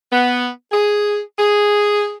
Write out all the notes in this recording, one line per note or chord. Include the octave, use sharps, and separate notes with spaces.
B3
G#4
G#4